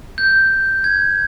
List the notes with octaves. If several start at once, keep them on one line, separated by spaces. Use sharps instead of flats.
G6
G#6